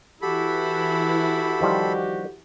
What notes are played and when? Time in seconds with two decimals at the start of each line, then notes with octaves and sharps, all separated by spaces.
0.22 E3 E4 F#4 G4 A4 B5
1.61 D#3 F3 G3